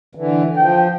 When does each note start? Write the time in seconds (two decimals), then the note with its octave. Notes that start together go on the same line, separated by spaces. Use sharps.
0.15 D3 E3
0.57 F3 G5